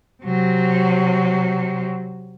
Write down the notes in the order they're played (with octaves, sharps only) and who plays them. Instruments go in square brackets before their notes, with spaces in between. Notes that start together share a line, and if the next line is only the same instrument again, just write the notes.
[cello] C3 F#3